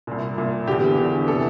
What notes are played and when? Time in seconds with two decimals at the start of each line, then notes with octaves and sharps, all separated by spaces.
0.07 C2 A#2
0.38 C2 A#2
0.68 E2 D3 G4
0.97 E2 D3
1.28 C3 E3 A4